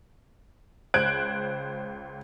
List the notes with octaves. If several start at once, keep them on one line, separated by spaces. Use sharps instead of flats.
C#2 C5 F#6 G#6 D7